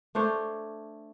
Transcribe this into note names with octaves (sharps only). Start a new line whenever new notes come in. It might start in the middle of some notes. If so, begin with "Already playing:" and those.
A3 D4 C5 C#5